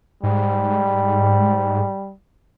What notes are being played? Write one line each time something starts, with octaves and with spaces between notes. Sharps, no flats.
G#2 G3